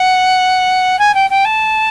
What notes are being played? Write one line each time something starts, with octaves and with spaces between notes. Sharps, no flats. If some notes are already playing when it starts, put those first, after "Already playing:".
Already playing: F#5
G#5
G5
G5
A5